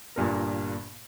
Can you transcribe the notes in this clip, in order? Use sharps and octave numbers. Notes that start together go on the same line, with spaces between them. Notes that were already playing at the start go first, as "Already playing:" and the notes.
G1 G2 A#2 A#4